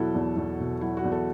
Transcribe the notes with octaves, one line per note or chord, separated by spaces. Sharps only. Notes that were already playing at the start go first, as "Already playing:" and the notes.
Already playing: E2 B2 F#3 E4 F#4 A4
E2
E2
B2
F#3 E4
F#4
E2
A4